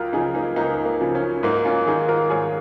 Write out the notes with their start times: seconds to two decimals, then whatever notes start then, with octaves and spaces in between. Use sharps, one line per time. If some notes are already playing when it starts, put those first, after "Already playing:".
Already playing: C#2 F4 A#4
0.13 C#3 F3 D#4 G#4
0.35 A#3 D#4
0.56 C#2 A#3 D#4
0.85 A#3
1.01 C#3 F3
1.15 C#4
1.43 G#2 A#3 D#4
1.65 C#4 F4
1.86 D#3 D#4 G#4
2.08 F4 A#4
2.30 G#2 G#4 C#5